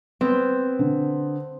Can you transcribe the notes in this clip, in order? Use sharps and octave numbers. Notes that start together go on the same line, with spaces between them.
B3 C4
D3